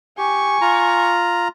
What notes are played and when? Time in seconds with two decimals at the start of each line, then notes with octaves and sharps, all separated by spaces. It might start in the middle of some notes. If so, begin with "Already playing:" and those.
0.18 G4 G#5 C#6
0.61 F4 A#5